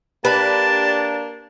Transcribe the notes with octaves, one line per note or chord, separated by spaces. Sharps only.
A#3 D4 G4 B4 A5